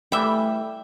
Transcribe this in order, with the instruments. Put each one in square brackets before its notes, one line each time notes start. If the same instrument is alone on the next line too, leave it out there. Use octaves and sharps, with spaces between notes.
[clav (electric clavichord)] E3 G3 [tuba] A3 [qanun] E5 G5